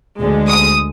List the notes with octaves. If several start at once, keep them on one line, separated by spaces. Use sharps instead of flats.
D2 D3 G#3
D#6